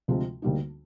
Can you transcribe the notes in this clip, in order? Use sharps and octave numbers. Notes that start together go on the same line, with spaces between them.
D2 C3 F3 G#3
D2 D3 G3 A#3 D#4